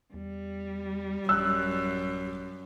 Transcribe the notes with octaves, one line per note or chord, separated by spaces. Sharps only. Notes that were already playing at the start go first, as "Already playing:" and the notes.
E2 G3
A1 F#2 E6 F#6